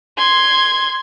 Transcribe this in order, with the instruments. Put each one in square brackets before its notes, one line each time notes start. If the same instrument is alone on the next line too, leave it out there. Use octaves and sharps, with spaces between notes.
[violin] C6 G#6